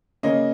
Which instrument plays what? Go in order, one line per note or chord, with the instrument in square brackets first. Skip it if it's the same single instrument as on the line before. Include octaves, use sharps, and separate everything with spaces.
[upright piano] C#3 A#3 C#4 D#5